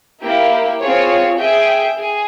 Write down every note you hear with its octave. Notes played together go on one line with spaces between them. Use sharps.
A#3 E4 G4
C4 F4 G#4 C#5
G#4 E5 G5
G#4